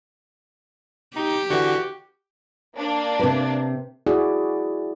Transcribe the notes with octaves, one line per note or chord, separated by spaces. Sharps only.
D#4 G4
D3 E3 F#4
A#3 D4
C3 B4
E4 F#4 G#4 D5